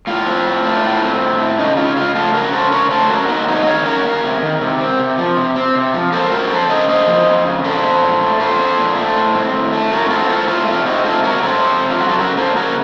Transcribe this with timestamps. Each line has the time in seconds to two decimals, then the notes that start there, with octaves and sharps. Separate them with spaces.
0.07 A2 F4
0.26 C4
0.45 A2
0.64 A3
0.83 A2
1.02 C4
1.21 A2
1.39 A3
1.58 C#3 D#4
1.77 C#4 F4
1.96 C#3 F4
2.15 A3 F4 A4
2.34 C#3 F#4 A#4
2.53 C#4 A4 C5
2.72 C#3 A#4 C#5
2.91 A3 A4 C5
3.10 C#4 F#4 A#4
3.28 A#3 D#4 F#4
3.48 C3 D#4 F#4
3.66 D#3 C#5 F5
3.85 C#4 A#4 C#5
4.04 A#3
4.24 C3
4.42 D#3
4.61 C3
4.81 C4
4.99 C3
5.18 F3
5.37 C3
5.56 C4
5.75 C3
5.94 F3
6.12 A#3 A4 C5
6.32 F3 F#4 A#4
6.51 F2 A4 C5
6.69 C#3 C5 D#5
6.88 A#3 C5 D#5
7.08 F3
7.27 F2
7.45 C#3
7.64 A#2 A4 C5
7.83 C4
8.02 A#2
8.21 A3
8.40 A#2 A4 C5
8.59 C4
8.78 A#2
8.97 A3
9.16 A2
9.35 C4
9.53 A2
9.73 A3
9.91 A2 F#4 A#4
10.10 C4 F4 A4
10.20 F#4
10.29 A2 F4 A4
10.48 A3 F4
10.67 C3 F4
10.86 C4 D#4 F#4
11.04 C3 F4 A4
11.24 F#3 F#4 A#4
11.42 C3 A4 C5
11.62 C4
11.81 C3
11.91 F4
12.00 F#3 F#4
12.09 A4
12.18 C#3 F#4 A#4
12.37 A#3 A4 C5
12.56 C#3 F#4 A#4